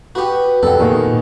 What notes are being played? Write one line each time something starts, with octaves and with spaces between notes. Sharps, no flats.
F#4 G4 B4 F#5 D#6
F1 F2 G4 A4 F#5
A#2 D#3 A#3 B3 F#4 G#4 D#5